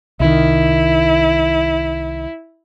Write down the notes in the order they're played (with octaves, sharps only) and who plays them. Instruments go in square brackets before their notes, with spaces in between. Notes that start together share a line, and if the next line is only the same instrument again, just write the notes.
[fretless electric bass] C2 D#3 [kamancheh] E4